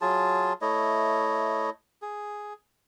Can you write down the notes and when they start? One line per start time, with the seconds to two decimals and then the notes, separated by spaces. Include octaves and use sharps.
0.01 F#3 F4 G#4 A5
0.62 A3 E4 C#5 D#5
2.02 G#4